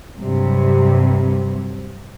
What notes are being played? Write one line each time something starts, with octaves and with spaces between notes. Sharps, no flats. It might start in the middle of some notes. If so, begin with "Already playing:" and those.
G2 C3 F#3 G3